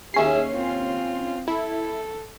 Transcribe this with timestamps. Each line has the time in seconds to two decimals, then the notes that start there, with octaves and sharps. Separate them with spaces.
0.14 D#2 C#4 G#4 E5 C7
0.52 C4 F4
1.48 E4 A4